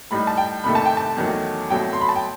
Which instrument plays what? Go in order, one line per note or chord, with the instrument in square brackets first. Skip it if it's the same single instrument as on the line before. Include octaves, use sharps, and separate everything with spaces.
[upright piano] A2 G3 D#4 B5
A5
G5
C2 C3 D#3 A3 B5
A5
G5
A5
E2 D#3 F#3 A3
C2 B2 F#3 A3 G5
C6
B5
A5
G5